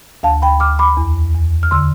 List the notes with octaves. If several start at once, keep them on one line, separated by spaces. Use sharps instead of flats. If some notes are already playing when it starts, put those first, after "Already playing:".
D2 F5 A5
G5 B5
D2 D6 F6
B5 D6
E2
E2
F6
D3 C6 E6